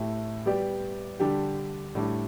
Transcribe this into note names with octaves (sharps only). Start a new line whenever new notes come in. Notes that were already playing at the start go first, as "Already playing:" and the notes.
Already playing: A2 A3 E4 G4
G3 B3 G4 D5
D3 G3 D4 G4
A2 G3 D4